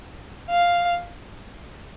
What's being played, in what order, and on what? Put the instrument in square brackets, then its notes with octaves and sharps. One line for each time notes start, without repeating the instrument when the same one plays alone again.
[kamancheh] F5